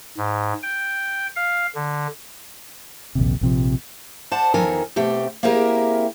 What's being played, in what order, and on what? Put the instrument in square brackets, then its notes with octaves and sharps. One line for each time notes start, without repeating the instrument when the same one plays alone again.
[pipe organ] G#2
G5
F5
D3
[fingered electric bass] A#1 D#2 C3
A#1 C3 F3
[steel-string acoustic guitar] C5 D5 F#5 A5
E2 D#3 F3 A4 A#4 G#5
B2 A3 C4 G4
A#3 C4 E4 G4 G#4 A#4